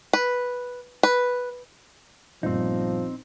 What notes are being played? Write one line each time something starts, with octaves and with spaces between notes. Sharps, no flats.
B4
B4
G1 A#2 F3 C4 D#4